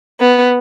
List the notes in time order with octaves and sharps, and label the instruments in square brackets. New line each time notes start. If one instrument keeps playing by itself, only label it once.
[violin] B3